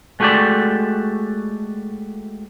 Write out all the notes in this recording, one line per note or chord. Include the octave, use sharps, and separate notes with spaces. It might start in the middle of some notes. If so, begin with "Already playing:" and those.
G#3 A3 F#4 G4 A4 D5